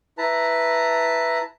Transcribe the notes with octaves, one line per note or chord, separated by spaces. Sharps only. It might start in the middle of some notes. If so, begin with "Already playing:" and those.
E4 B4 A5 A#5